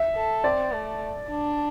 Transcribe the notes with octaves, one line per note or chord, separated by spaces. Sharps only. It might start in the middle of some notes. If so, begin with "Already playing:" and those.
Already playing: E5
A4
C4 D5
A3
D4